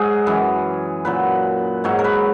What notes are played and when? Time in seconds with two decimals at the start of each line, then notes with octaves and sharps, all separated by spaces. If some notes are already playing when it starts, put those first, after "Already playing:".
Already playing: G#2 F#3 G#4
0.27 F#2 E3
1.05 A#2 F#3 B4
1.84 G#2 F#3 C#5
1.99 A#4
2.04 B4